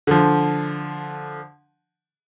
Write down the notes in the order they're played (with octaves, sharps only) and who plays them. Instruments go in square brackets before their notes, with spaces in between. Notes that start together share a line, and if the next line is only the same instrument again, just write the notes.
[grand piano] D3 F3